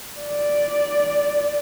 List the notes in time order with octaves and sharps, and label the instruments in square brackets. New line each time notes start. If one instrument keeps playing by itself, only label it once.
[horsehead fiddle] D5